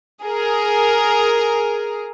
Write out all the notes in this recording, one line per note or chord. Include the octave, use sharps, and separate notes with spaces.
G#4 A#4